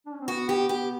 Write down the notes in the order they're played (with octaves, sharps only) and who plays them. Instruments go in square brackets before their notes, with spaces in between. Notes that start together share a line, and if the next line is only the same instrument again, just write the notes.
[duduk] D4
C#4
C4
[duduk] B3 [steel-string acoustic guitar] F#4
[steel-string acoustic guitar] G4
G4